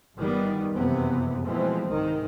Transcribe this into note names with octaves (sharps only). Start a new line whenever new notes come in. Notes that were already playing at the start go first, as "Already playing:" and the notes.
G1 D#3 G3 B3
F#1 F2 C3 E3 B3
B2 E3 F3 G#3 A3 C4
C2 G#2 D#3